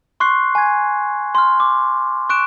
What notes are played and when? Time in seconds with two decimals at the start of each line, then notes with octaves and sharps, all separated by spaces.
0.20 C6 C#6 F#6 C7
0.55 G#5 G#6
1.35 C6 F6
1.60 D6
2.30 C#6 F#6 D7 E7